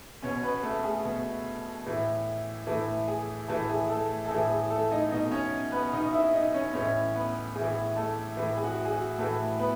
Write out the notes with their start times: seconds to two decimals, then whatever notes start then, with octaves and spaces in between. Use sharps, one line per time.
0.22 B2 C#4 C#5
0.43 B3 B4
0.63 A3 A4
0.84 G#4
1.05 B2
1.86 A2 E3
2.67 A2 E3 A3 A4
3.07 G#4
3.48 A2 E3 A3 A4
3.70 G#4
3.90 A3 A4
4.26 A4
4.31 A2 E3 G#4
4.50 G#4
4.70 A3 A4
4.91 D#4 D#5
5.11 B2 D#4 D#5
5.31 C#4 C#5
5.72 B3 B4
5.93 B2 D#4 D#5
6.13 E4 E5
6.33 D#4 D#5
6.54 C#4 C#5
6.74 A2 E3 C#4 C#5
7.15 B3 B4
7.55 A2 G#4
7.61 E3
7.96 A3 A4
8.37 A2 E3
8.57 G#4
8.64 F#4
8.85 G#4
8.92 F#4
9.18 A2 E3 A3 A4
9.59 B3 B4